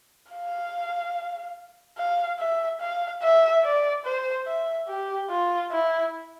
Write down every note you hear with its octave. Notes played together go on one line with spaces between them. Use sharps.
F5
F5
E5
F5
E5
D5
C5
E5
G4
F4
E4